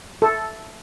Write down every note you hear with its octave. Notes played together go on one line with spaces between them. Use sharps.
A4